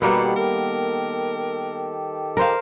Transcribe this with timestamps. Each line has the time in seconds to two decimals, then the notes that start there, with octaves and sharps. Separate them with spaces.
0.02 B2 D#3 G3 A#3 B3 G4 A4
0.36 A#4
2.37 A#4 C5 F5